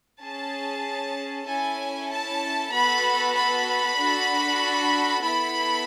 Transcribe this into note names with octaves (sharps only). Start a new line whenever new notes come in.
C#4 G#4 A5
C#4 E4 A4 G#5
A5
B3 F#4 A4 B5
B5
D4 F#4 A4
B3 E4 A4 B5